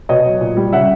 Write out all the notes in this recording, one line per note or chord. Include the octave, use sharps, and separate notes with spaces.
B2 C#5 D#5
F#3
A#2
G3
C#3 E5 F#5